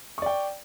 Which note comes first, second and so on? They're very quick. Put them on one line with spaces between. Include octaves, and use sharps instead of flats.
C#6 D5 G5